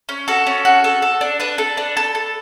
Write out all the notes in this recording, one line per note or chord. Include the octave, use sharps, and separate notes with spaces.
C#4
F#4 A4
C#4
F#4
A4
A4
D4
D4 B4
A4
D4
A4
A4